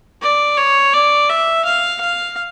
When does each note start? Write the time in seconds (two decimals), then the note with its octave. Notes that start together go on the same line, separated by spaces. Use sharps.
0.22 D5
0.58 C#5
0.93 D5
1.29 E5
1.65 F5
2.01 F5